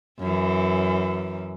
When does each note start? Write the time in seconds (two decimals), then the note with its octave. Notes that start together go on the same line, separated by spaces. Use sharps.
0.19 F#2 E3